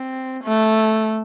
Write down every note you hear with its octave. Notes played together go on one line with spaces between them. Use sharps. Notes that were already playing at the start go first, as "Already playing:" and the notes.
Already playing: C4
A3